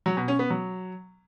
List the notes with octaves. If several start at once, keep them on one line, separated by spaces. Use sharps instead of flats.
F#3
B2
C#4
B3
F#3